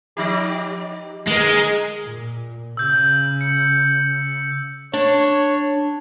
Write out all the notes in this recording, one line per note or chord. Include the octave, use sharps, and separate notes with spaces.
F3 D#4 G4
D3 G#3 A#4
A#2
C#3 E6 G6
C#7
D4 C#5